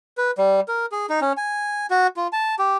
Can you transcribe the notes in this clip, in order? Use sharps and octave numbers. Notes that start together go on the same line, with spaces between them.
B4
G3
A#4
G#4
D#4
C#4
G#5
F#4
F4
A5
G4